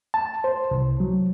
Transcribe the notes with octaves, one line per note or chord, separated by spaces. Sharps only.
A5
C5
C2
F#3